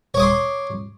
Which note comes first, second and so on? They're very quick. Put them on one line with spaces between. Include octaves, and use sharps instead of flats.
C#5 D6 D#6 C6